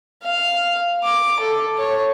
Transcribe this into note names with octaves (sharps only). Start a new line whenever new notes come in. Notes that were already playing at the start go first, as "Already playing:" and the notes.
F5
D6
A4
C#5